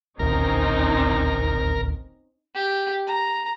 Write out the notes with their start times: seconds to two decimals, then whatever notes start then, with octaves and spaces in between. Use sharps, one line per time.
0.19 D#1 A1 D2 C4 C#4 D#4 A#4
2.55 G4
3.07 A#5